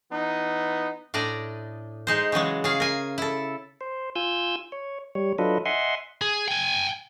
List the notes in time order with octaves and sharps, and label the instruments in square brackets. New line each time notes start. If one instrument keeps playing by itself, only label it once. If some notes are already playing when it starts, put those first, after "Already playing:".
[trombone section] E3 B3 D#4
[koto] A2 D4 D5 D#5 A#5
G#3 D#4 C5
C#3 E3 F#3 G#3
C#3 G#4 F5
A#4 G#5
E4 A4
[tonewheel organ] C5
F4 G#5 E6 G6
C#5
G3 C#5
F#3 D4 F4 A4 B4 D#5
D#5 E5 F#5 G#5 C6
[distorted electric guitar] G#4
G5 G#5